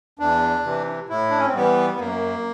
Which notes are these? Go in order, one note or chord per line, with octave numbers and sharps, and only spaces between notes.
E2 D4
C3 E3
A2 E4
D4
C#4
C4
E3 G3 B3
B3
F#2 A#3